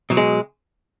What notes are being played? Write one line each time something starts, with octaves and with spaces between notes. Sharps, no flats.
B2 F#3
G#3